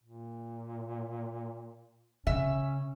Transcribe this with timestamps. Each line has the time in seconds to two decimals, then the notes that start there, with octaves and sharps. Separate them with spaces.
0.04 A#2
2.27 C#3 C#4 E5